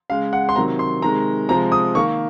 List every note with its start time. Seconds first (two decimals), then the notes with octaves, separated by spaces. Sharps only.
0.10 C#3 G#3 F5
0.33 F#5
0.49 C6
0.55 C3 D#3 F#3 A#5
0.79 C6
1.02 C3 D#3 G#3 A#5
1.49 C3 F3 G#3 A#5
1.72 D#6
1.95 D#3 A#3 C#6